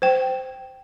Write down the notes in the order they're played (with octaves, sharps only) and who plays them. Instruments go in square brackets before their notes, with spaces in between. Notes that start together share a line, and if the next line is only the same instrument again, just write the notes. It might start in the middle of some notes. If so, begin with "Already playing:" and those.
[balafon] C5 G5